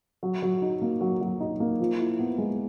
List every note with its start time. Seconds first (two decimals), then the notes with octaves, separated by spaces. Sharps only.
0.23 F#3
0.42 F#3
0.62 D#4
0.82 A#3
1.01 F#3
1.21 F#3
1.40 D#4
1.60 A#3
1.80 F3
1.99 E4
2.19 B3
2.38 G#3